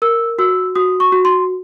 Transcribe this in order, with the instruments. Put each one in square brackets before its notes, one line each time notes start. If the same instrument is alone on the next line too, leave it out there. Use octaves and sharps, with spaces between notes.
[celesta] A#4 E6
F#4 E6
F#4 D#6
C#6
F#4
C6